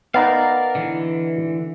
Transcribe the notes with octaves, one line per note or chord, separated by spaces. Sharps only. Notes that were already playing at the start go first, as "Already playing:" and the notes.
B3 D#4 A#4 D5 F5
D3 E3